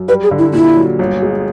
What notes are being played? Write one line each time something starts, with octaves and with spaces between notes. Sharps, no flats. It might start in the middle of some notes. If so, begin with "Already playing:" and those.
Already playing: F#2
G3 B4
G#4
D3
E4
A#2 E4
F#3
G1
G#3